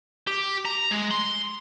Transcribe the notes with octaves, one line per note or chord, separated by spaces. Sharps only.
G4
A#5
G#3
C6